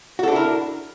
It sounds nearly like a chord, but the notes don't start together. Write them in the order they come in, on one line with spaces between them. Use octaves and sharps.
F#4 A4 D4 E4 A#4